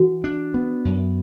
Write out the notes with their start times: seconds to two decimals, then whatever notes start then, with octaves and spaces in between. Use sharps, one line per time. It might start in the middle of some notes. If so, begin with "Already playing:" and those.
Already playing: E3 F#4
0.24 D4
0.54 B3
0.85 F#2